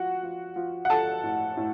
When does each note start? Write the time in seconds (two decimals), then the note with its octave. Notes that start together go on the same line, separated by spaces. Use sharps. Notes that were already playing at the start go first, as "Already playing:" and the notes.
Already playing: F3 F#4 F#5
0.23 F3
0.56 F3
0.85 F#5
0.90 F3 A4 A5
1.24 A2
1.57 A2